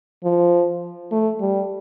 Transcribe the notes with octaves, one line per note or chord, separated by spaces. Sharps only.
F3
A3
G3